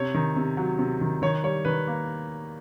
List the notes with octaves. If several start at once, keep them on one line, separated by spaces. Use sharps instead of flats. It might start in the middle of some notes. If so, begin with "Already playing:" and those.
Already playing: C3 C#5
D#3
C3
F#3
C3
D#3
D#3 C#5
G3 C#5
D#3 B4
A#3